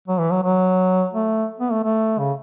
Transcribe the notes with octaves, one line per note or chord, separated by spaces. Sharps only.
F#3
E3
F#3
F#3
A3
B3
A3
A3
C#3